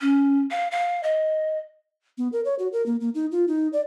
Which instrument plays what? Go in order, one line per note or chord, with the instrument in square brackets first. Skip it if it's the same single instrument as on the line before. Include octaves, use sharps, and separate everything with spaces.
[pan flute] C#4
F5
F5
D#5
[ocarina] B3
A#4
C#5
F#4
A#4
A#3
A#3
D#4
F4
D#4
D5